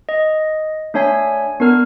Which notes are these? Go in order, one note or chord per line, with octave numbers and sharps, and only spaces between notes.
D#5
A3 D4 C#5 G#5 B6
B3 D4 A#4 F6